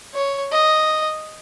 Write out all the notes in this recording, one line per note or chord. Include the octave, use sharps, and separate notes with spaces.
C#5
D#5